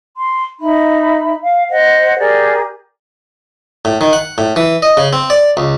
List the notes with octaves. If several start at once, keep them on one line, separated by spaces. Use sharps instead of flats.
C6
D#4 E5 B5
F5
C5 D#5 F#5
G4 G#4 A#4 D5
A2
D#3
F#5
A2
E3
D#5
C#3
C4
D5
C#2